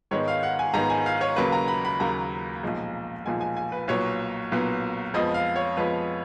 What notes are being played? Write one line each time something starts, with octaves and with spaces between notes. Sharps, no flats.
G#2 D#3 G#3 B3 C#5
F5
F#5
G#5
G#2 D#3 G#3 B3 A#5
G#5
F5
C#5
D#2 C#3 F#3 A#3 B4
A#5
B5
B5
D#2 C#3 F#3 A#3 A#5
B1 A#2 F3 G#3
B1 A#2 F3 G#3 G#5
G#5
G#5
B4
B1 A#2 F#3 B3 C#5
B1 A#2 F#3 B3
F2 F3 G#3 B3 D#5
F5
C#5
F2 F3 G#3 B3 B4